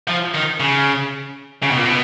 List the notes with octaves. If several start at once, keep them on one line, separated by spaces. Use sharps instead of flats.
F3
D#3
C#3
C#3
B2
A#2
B2